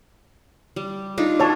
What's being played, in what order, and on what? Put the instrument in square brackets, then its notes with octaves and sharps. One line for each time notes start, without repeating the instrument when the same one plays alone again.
[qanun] G3
D4 D#4 F4
[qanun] F#4 A#4 [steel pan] C#5 A5